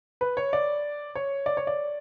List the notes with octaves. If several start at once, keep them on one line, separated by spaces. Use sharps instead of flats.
B4
C#5
D5
C#5
D5
C#5
D5